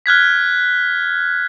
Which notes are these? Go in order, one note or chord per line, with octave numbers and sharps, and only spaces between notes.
F6 F#6 G#6 B6